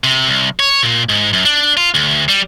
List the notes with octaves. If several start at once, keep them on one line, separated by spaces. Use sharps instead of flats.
C3
C2
C#5
A#2
G#2
F#2
D4
F4
D2
G3